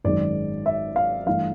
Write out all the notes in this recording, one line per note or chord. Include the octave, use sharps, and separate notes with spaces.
G#1 F#2 D#3 G#3 D5
E5
F5
G2 E3 A3 F5